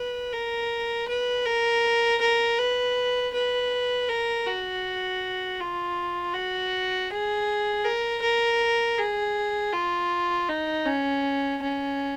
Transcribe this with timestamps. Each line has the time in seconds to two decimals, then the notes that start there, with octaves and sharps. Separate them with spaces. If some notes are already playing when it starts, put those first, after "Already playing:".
Already playing: B4
0.32 A#4
1.08 B4
1.46 A#4
2.21 A#4
2.58 B4
3.34 B4
4.09 A#4
4.46 F#4
5.60 F4
6.34 F#4
7.10 G#4
7.85 A#4
8.22 A#4
8.98 G#4
9.73 F4
10.49 D#4
10.85 C#4
11.62 C#4